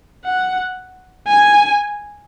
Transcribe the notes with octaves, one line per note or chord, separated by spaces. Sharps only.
F#5
G#5